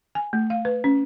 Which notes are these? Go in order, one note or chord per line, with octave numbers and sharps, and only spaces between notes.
G#5
A3
F5
B4
C#4